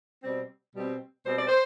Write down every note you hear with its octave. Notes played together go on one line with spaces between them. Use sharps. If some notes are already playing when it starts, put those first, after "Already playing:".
B2 G3 C4
B2 G3 C4
B2 G3 C4 C5
D5
C5